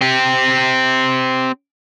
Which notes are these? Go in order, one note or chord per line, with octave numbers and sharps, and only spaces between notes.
C4 G4